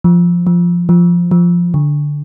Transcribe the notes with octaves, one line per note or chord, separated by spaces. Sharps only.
F3
F3
F3
F3
D3